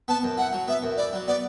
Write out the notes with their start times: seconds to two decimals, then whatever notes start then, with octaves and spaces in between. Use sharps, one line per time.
0.08 B3 A5
0.23 F#2
0.38 E4 F#5
0.53 F#3
0.68 B3 E5
0.83 F#2
0.97 E4 D5
1.13 F#3
1.27 B3 D5